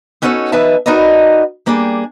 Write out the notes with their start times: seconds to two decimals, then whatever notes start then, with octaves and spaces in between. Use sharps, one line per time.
0.22 B3 C#4 D#4 F#4 A4 C#5
0.52 E3 D#4 B4 D#5 E5 A5
0.86 D#4 F#4 A#4 B4 D5 D#5
1.66 G3 A#3 D4 G4 G#4